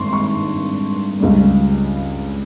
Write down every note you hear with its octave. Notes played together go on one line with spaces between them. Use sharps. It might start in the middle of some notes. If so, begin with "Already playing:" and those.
Already playing: G#1 G2 D#3 C6 C#6
C#6
C#2 C#3 G3